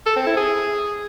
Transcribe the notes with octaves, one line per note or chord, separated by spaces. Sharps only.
A4
C4
E4
G#4